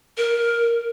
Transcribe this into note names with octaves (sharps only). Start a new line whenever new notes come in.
A#4